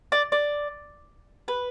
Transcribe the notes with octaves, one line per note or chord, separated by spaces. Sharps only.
D5
D5
B4